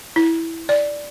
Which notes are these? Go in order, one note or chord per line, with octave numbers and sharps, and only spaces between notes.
E4
D5